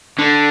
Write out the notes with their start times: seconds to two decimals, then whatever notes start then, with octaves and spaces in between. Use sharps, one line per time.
0.19 D3